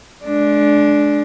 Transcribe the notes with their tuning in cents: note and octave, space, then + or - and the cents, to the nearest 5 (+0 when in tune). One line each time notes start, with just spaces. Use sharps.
G#3 +35 D4 +0